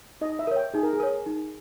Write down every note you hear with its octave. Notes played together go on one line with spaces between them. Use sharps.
D#4 D#5
E5
A#4 C#5
G5
D#4 G#4
A#4
G#4
A#4 C#5
D#4